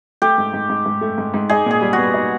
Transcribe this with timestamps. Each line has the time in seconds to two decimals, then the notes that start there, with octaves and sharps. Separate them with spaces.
0.22 A3 G4
0.38 G#2
0.53 G#2
0.70 G#2
0.86 G#2
1.01 A3
1.18 G#2
1.34 G#2
1.49 D#4 G#4
1.66 A#2 G#4
1.82 G3
1.93 B3 F#4
2.14 D#4